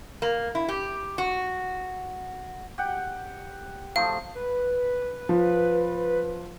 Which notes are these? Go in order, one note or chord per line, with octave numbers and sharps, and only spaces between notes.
A#3
E4
G4
F#4
G4 F#5 G5
F3 A3 D#4 F5
B4
F3